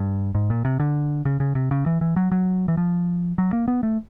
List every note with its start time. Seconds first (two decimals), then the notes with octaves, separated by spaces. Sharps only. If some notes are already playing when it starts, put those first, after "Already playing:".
Already playing: G2
0.35 G#2
0.50 A#2
0.65 C3
0.80 D3
1.25 C#3
1.40 C#3
1.55 C3
1.71 C#3
1.86 E3
2.01 E3
2.16 F#3
2.32 F#3
2.68 E3
2.77 F3
3.38 F#3
3.53 A#3
3.68 B3
3.83 A3